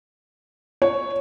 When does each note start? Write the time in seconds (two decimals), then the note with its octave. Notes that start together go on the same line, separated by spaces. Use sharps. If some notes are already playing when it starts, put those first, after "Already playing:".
0.82 C#5